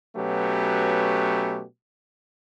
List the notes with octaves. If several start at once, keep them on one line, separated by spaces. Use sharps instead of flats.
B2 F#3 A3 C#4 G4 B4